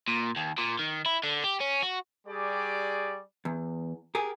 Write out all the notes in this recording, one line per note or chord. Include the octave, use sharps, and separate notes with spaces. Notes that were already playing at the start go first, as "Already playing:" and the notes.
A#2
D#2
A#2
D#3
E4
D3
G4
C#4
F#4
G3 G4 G#4 D5 C#6
E2
G4 G#4 A#4